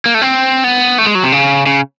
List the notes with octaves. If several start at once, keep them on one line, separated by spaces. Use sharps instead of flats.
A#3
A3
C4
B3
A3
G#3
F#3
C3
C#3
C#3